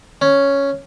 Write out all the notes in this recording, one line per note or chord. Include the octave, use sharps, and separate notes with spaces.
C#4